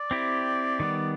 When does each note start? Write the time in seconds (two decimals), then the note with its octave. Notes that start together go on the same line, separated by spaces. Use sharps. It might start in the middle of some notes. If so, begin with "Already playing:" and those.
Already playing: D5
0.11 C4 E4 G4
0.80 D#3 G3 B3